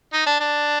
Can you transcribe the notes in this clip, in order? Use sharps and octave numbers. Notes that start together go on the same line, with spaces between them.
D#4
D4
D4